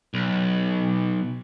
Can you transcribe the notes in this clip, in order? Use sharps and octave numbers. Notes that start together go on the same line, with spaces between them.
B1